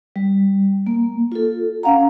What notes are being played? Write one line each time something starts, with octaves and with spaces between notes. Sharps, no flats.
G3
A#3
F4 A4
C#4 F5 F#5 A#5